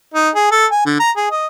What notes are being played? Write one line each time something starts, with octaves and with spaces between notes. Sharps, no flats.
D#4
G#4
A4
G#5
D3
A#5
G#4
D#5